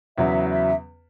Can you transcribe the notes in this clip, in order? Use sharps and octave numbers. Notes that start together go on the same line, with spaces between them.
E2 C#3 F#3 B3 E5
E5